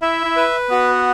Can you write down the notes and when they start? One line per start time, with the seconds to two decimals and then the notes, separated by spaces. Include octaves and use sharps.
0.02 E4 E5
0.25 E4
0.36 B4
0.70 B3 F#4